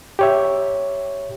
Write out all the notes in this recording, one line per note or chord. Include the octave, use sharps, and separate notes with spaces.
G4 C#5 E5